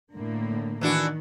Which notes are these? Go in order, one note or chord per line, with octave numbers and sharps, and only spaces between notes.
A2 D3 A#3
D#3 E3 D4 F#4